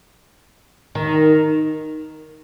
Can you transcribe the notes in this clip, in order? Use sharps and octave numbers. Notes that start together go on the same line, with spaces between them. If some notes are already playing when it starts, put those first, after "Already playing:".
D#3